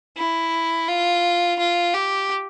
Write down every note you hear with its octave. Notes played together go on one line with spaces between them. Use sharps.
E4
F4
F4
G4